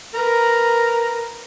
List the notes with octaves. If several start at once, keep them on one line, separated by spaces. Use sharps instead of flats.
A#4 B4 A#5